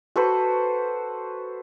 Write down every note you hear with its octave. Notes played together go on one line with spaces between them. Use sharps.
F#4 A4 B4 C5